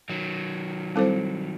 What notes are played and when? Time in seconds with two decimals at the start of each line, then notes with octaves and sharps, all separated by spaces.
0.09 D#3 F#3
0.96 G3 C4 E4 A4 C5